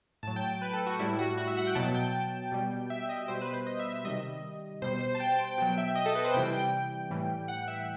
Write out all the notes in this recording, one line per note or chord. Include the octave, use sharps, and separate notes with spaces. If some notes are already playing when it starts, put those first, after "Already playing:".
A2 F#3 A5
G5
B4
A4
F#4
A2 G3 E4
F#4
F#4
E5
F#5
G5
B2 F#3 A5
G5
B2 G3
E5
D#5
B2 G3 C5
B4
C5
D#5
E5
E5
C3 D#3 G3 D#5
B2 G3 C5
C5
A5
G5
A5
G5
B2 F#3 G5
E5
D#5
A4
B4
C5
C3 E3 G3 G5
G5
A2 E3 G3
F#5
E5